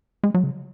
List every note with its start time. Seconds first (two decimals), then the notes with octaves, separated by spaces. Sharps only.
0.23 G#3
0.34 F#3
0.44 C#3